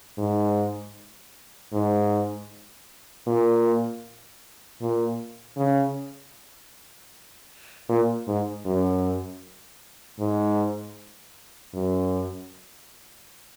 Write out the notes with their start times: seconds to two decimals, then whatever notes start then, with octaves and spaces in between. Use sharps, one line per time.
0.18 G#2
1.73 G#2
3.27 A#2
4.81 A#2
5.57 C#3
7.89 A#2
8.27 G#2
8.66 F#2
10.19 G#2
11.74 F#2